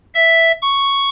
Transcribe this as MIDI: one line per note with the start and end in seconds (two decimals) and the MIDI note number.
0.14 0.52 76
0.62 1.10 85